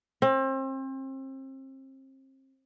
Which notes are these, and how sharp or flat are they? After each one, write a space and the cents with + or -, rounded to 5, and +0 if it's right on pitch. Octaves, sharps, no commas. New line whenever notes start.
C4 +35